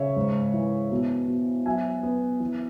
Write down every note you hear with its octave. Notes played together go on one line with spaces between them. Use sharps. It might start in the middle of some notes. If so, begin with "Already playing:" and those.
Already playing: C#3 C#5 E5
G#2
E3
B2
B2
F#3 E5 G#5
B3
E3